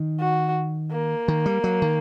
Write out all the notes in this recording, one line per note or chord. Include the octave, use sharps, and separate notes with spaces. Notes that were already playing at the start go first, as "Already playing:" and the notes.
Already playing: D#3
F#4
A#3
D#3
G3
F#3
D#3